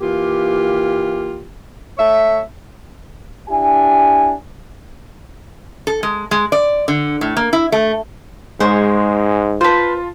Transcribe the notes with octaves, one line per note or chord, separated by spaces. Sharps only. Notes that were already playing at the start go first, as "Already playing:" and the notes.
E3 A#3 F4 G4
A3 C#5 E5
D4 E4 G4 G#5
A4
G#3
G#3
D5
D3
A2
A#3
E4
A3
G#2 G#3 C5 C#5
F4 B4 C5 A5